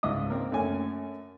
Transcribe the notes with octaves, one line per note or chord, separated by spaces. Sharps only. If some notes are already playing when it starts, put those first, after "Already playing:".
C#2 G#2 D#5 E5 D#6
A#3 C4
F#2 A3 C#4 G#5